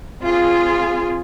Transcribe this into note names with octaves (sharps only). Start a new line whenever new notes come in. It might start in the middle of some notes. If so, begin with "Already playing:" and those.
C4 F4 G#4